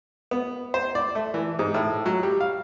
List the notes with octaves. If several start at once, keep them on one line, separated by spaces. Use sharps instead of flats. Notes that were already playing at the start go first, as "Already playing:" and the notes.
B3
C5
D5
A3
E3
G#2
A2
F#3
G3
F5